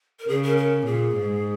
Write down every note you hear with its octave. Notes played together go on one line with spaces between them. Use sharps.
A#4
C#3 G#4
A#4
A#4
A#2 G#4
G#2